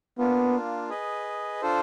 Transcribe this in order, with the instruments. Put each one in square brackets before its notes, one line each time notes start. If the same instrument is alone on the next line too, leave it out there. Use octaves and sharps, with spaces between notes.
[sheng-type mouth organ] A#3 D4 F4 [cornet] B3
[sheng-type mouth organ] G#4 B4 D#5
D4 F4 A4 C5